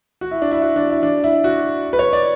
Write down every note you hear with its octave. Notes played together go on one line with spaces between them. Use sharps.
F#4
E4
D4
E4
F#4
D4
E4
D4
E4
F#4
B4
C#5
D5